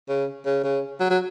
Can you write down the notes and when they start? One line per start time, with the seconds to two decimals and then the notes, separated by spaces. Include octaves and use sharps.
0.09 C#3
0.46 C#3
0.63 C#3
1.00 F#3
1.10 F#3